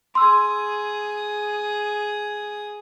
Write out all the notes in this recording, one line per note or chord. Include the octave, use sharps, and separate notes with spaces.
G#4 C6 D#6 E6